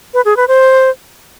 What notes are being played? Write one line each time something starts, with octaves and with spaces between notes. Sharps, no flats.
B4
G#4
B4
C5